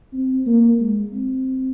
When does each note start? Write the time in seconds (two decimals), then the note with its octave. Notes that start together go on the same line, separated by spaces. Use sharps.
0.14 C4
0.46 A#3
0.80 G#3
1.13 C4